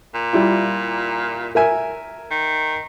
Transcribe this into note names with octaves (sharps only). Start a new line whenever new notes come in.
A#2
G3 E4 F4
A#4 E5 G#5
D#3